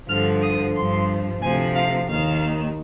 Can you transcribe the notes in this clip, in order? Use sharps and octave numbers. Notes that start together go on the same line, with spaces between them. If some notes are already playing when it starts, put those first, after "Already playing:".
G2 D3 F3 F6
D#6
G2 F3 C6
D2 C3 F3 G#5
F5
D#2 D#3 F5